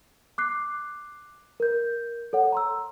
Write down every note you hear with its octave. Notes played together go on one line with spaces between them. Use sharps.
D6 F#6 C7
A#4 G6
A4 C#5 F#5
A#5 C6 E6